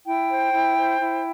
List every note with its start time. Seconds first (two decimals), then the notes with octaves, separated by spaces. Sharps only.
0.05 E4 G5
0.29 C5
0.53 E4
0.76 C5
1.00 E4